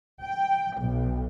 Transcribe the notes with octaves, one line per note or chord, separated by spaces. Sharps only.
G5
B1